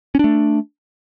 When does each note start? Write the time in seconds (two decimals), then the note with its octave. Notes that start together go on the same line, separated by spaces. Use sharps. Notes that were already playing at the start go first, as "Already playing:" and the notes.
0.15 C#4
0.19 D4
0.24 A3